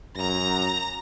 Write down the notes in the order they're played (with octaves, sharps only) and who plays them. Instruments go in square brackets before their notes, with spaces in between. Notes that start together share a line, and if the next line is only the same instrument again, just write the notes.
[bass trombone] F#2 [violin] A#5 A#6